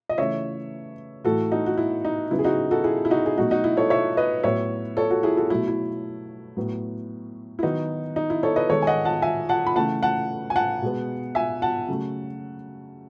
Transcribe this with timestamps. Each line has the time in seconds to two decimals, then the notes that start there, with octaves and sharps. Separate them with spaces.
0.09 D#5
0.18 C#3 E3 A3 C#5 E5
1.24 A2 E3 A3 F#4 A4
1.51 D#4 F#4
1.66 F#4
1.78 E4
2.05 D#4
2.31 C#3 F#3 B3 E4
2.39 G#4
2.44 D#4 F#4
2.71 F#4 A4
2.84 E4 G#4
3.05 E4
3.11 D#4 F#4
3.26 G#4
3.38 B2 F#3 A3 D#4 F#4
3.51 D#4 F#4
3.64 E4
3.77 A4 C#5
3.90 C#5 E5
4.17 B4 D#5
4.43 A2 F#3 B3 C#5 E5
4.97 A4 C#5
5.10 F#4 A4
5.23 E4 G#4
5.37 F#4 A4
5.50 B2 F#3 A3 E4
5.68 E4
6.57 A2 F#3 B3
7.59 E4
7.63 D#3 F#3 B3 D#4 F#4
8.16 D#4
8.30 E4
8.43 A4 C#5
8.56 B4 D#5
8.70 D#3 G#3 B3 A4 C#5
8.82 G#5
8.87 D#5 F#5
9.05 F#5 A5
9.22 E5 G#5
9.49 F#5 A5
9.66 B5
9.76 C#3 E3 A3 F#5 A5
10.03 F#5 A5
10.50 G#5
10.56 F#5 A5
10.82 B2 G#3 B3
11.35 E5 G#5
11.62 F#5 A5
11.88 C#3 F#3 A3